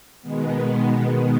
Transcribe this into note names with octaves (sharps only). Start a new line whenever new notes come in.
B2 D#3 G#3 B3